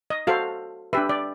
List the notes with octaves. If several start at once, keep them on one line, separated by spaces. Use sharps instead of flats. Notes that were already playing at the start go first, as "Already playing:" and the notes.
D#5
F#4 A4 C5 F5
D4 G4 B4 E5
D5